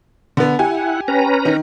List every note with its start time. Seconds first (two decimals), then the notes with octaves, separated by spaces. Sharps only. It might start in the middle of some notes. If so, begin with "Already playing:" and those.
0.37 D3 B3
0.59 E4 G4 F#5 G#5
1.08 C#4 B4 A#5
1.45 D#3